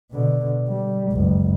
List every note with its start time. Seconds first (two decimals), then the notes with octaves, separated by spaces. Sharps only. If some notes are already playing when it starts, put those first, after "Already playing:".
0.12 B2 D3
0.68 G3
1.11 F#1 C#2